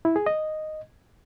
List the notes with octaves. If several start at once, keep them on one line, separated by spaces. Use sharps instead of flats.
E4
G#4
D#5